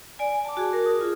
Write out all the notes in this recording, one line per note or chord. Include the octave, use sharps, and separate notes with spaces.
D5 G#5
A5 D6
F#4 G#4
A#4
D#6
F4 G#4